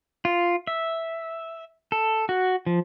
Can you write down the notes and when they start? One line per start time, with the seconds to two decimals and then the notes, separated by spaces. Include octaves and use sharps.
0.25 F4
0.67 E5
1.92 A4
2.29 F#4
2.66 F3